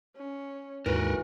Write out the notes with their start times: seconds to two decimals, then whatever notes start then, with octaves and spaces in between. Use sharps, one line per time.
0.17 C#4
0.86 D#2 G#2 E3 F#4 A#4 B4